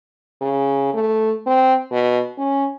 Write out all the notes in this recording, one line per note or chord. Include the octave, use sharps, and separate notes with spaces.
C#3
A3
C4
B2
C#4